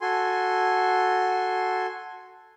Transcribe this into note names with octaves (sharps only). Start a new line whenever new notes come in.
F#4 A4 G#5 C6